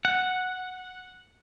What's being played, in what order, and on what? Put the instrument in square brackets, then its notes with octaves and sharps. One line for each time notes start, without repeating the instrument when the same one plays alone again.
[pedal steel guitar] F#5